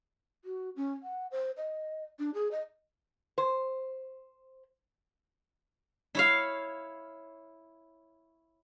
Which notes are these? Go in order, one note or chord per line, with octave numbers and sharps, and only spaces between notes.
F#4
C#4
F#5
C5
D#5
D4
G#4
D#5
C5
E4 C#5 F5